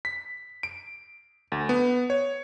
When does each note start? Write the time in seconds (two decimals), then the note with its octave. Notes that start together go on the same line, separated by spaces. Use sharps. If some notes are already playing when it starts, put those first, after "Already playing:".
0.05 B6
0.63 D7
1.52 D2
1.69 B3
2.10 C#5